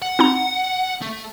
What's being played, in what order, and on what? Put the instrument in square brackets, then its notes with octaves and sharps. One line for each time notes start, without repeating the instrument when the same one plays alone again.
[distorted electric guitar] F#5
[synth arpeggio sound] C4 D#4 A#5
[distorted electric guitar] A3